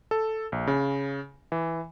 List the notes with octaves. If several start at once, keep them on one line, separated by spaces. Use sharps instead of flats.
A4
A#1
C#3
E3